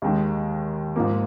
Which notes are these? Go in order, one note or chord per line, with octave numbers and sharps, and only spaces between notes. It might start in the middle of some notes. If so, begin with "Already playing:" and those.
D#2 D#3 G#3
G#2 F3 A#3